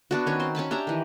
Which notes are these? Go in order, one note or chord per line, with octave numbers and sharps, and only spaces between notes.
B3 D4 F#4
D#3 C#4 C#5
C4 C5 C6
C#4 G#5 A5 B5
D4 G4 E5 A#5
D#3 E3